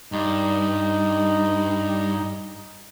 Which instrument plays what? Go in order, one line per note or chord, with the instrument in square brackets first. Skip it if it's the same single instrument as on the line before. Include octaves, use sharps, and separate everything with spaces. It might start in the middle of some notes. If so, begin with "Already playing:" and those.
[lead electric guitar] G2 [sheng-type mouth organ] D#4